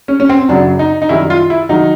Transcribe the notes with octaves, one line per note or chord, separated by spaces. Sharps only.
C#4
C#4
C4
F#2 C#3 F#3 D4
D#4
D#4
F#2 D#3 G3 E4
F4
E4
D#3 F#3 D#4